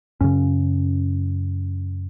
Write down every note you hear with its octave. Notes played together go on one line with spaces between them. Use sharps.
F#2 C#3 C#4